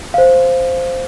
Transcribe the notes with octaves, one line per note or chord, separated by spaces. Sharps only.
C5 F5